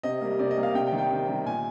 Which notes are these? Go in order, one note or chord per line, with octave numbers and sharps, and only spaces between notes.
C3 D#5
G3 A#3
C3 D5
D#5
G3 A#3
F5
C3 G5
G5
D#3 G3
G5
C3
D#3 G3
A#2 G#5